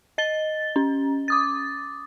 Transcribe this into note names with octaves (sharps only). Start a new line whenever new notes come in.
D#5 A6 G7
C#4
D6 D#6 A6